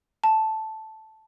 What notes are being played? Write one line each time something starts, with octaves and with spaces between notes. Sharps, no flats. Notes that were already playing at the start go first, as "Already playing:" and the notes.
A5